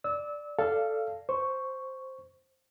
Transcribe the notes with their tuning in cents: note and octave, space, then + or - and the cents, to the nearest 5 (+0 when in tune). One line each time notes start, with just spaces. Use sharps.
D5 +0 E6 -30
A4 +0 D5 +0 F5 -15
C5 +0 C#6 +0